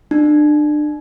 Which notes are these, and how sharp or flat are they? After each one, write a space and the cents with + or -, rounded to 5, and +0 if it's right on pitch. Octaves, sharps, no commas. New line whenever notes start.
D4 +30